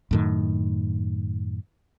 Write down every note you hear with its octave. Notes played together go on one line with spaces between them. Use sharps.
F#2 A2 D#3